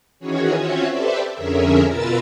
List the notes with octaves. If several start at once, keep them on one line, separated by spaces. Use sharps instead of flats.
D#3 E3 C#4 F#4 G#4 C#5
C4 C#4 F4 F#4 C#5 E5
G4 A4 B4 C5 D5 E5
F2 D3 C#4 G#4 A#4 E5
B2 F4 A#4 B4 E6 A6